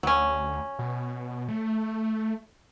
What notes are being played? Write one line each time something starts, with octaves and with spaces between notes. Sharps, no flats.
D2 F#3 C#4
B2
A3